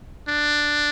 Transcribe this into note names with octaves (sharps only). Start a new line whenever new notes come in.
D4